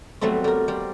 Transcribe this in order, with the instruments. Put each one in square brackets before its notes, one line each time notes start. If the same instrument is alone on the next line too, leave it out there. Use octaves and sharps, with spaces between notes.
[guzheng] F#3 G3 A3 B3 C4
G3 A#4
G3 C4